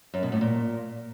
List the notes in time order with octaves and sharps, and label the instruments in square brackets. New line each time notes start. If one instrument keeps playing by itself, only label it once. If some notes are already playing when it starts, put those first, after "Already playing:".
[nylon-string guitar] F#2
B2
A2
A#2